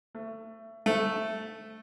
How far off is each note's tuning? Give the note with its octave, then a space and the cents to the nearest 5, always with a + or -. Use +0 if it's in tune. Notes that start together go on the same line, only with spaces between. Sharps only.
A3 +20
A3 +0